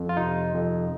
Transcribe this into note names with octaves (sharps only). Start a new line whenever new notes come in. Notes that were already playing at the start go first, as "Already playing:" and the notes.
Already playing: F2
F4
C3 D#4
F2